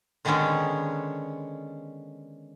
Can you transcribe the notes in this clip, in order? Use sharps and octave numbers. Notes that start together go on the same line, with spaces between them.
D3 D#3 G#3 B3 C#4